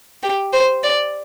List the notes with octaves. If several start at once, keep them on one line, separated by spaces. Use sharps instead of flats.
G4
C5
D5